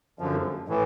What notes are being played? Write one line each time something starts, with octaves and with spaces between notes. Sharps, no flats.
F#2 D3 F3
A2 E3